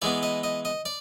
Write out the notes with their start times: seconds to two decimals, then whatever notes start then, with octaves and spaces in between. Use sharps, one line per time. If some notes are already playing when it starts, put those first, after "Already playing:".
0.02 E3 G#3 B3 D5
0.23 D#5
0.43 D#5
0.65 D#5
0.85 D5